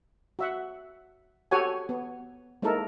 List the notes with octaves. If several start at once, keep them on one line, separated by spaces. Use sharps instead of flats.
F#4 E5 F#5
F#4 G4 A4 C#5 F#5 G#5
B3
G#3 A#3 D#4 E4 A4 A#4